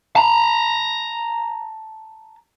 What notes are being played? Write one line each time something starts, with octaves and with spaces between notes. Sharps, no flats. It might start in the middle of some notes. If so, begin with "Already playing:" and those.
A5 A#5